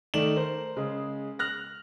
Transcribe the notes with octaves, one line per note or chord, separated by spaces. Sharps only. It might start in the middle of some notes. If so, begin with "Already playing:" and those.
D#3 A3 D5 E7 F#7
A#4 C5
C#3 G#3
F6 F#6 A#6